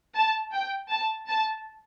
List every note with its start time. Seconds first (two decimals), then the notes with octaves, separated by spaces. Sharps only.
0.16 A5
0.54 G5
0.91 A5
1.29 A5